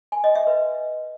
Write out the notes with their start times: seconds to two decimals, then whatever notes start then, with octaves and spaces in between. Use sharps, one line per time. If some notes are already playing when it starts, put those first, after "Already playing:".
0.12 G#5
0.24 D#5
0.35 E5
0.47 B4